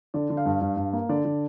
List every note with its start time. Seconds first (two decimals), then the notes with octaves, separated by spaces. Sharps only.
0.14 D3 D5
0.30 D3
0.37 F5
0.46 G2
0.61 G2
0.77 G2
0.93 A#3
1.09 D3 D5
1.25 D3